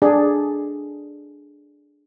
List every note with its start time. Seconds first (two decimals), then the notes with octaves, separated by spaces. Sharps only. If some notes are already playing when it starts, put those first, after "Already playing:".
0.02 D4 G#4 D5